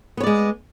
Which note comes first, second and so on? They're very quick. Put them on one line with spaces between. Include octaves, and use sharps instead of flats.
B3 C#5 D5 G#3